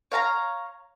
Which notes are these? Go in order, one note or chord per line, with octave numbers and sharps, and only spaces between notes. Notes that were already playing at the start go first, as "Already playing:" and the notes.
C#5 F5 A5 A#5